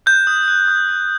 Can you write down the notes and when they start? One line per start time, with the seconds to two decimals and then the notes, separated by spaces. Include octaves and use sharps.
0.06 F#6 G6
0.27 D#6
0.48 F#6
0.68 D#6
0.89 F#6